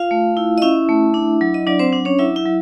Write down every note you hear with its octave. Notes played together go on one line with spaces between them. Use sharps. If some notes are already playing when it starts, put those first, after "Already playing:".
Already playing: F4 F5
A3
E4
D#5
C#4 E4 E5
A3
D4
F#3
D#5
F#3 D4 D5
C4 C5
D4
C#4 C#5
F#3 E4 E5
E4 E5
F#3